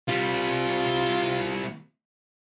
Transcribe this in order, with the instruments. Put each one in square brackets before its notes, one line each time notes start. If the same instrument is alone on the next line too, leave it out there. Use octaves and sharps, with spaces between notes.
[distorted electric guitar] G3 C4 [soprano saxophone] F4